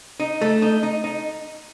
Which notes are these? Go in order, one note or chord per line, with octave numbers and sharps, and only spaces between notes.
D#4
A3
D#4
D#4
D#4